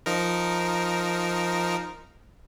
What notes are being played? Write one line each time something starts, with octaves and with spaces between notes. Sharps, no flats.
F3 D#4 A#4